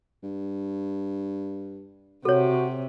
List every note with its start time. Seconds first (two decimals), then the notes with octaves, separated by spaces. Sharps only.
0.23 G2
2.25 C3 F#4 A4 C#5